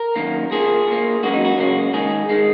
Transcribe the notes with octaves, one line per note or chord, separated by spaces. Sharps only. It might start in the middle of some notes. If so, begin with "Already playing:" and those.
Already playing: A#4
F#2 D#3 A#3
A#2 A#3 G#4
A#2 A#3
C#2 C#3 F#3 A#3 F#4
D#4
F#4
C#2 C#3 F#3 A#3
D#2 D#3 G#3 G#4
D#3 G#3